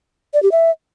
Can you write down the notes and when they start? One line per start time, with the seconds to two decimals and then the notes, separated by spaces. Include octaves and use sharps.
0.34 D5
0.43 G4
0.52 E5